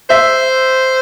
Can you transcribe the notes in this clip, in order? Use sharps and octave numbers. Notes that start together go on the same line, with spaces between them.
C5 E5